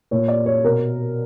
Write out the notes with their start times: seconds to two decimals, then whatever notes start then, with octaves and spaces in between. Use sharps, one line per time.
0.11 A#2 C#5
0.28 D5
0.46 C#5
0.64 B2 A#4